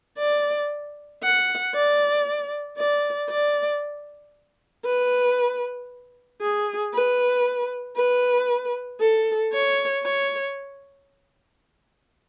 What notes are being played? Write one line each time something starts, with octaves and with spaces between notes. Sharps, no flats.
D5
F#5
D5
D5
D5
B4
G#4
B4
B4
A4
C#5
C#5